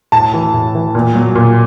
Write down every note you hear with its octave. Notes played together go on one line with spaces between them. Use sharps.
A2 A5
E3
A2
E3
A#2
F#3
A#2